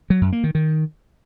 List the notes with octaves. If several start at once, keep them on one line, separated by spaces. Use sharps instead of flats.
F#3
F#2
A#3
D#3
D#3